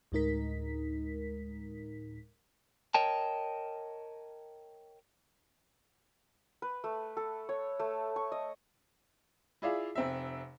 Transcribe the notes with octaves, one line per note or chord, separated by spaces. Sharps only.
D2 A2 G#3 D#4 A#4 B6
A#4 C#5 D#5 G5 A5
B4
A3
A4
C#5
A3
C#6
D#5
E4 F4 G#4 D5 E5 F5
F1 C4 E5